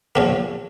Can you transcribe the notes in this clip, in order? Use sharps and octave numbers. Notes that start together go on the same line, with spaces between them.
A#1 A#2 F#3 A#3